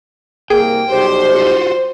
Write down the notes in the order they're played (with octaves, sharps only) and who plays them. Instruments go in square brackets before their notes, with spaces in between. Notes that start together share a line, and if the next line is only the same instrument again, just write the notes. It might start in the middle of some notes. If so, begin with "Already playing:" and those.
[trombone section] C2 A#3 [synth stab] G#4 [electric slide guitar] G5
[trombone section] B1 G3 G4 [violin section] C5
[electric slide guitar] F4 F#4